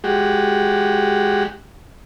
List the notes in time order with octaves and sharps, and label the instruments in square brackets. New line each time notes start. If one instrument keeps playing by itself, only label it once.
[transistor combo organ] G#3 F#4 G4